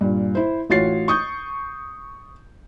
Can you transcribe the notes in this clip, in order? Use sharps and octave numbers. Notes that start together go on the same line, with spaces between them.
G2 A#2
E4 C5
A1 F4 F#4 C#5 A6 C7
C#6 D#6 G6